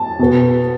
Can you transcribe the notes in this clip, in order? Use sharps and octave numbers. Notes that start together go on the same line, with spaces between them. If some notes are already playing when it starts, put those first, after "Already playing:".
Already playing: A5
B2 B3